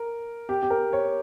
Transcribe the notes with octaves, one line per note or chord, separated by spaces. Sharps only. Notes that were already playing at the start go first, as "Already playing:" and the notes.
Already playing: A#4
G4
G4
A#4
C#5